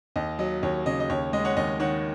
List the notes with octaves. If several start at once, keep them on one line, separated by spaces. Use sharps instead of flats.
D#2 D#5
F#3 D#5
D#2 C#5
C#3 D#5
D#5
D#2 C#5
G#3 D#5
C#5 F#5
D#2 D#5
D#3 C#5 F#5